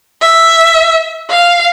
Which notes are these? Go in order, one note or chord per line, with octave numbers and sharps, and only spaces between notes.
E5
F5